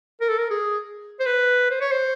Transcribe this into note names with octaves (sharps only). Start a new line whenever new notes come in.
A#4
A4
A#4
G#4
C5
B4
C5
C#5
C5